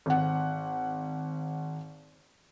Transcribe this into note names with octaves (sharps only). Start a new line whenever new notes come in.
G#1 F#5